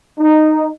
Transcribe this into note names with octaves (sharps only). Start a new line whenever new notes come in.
D#4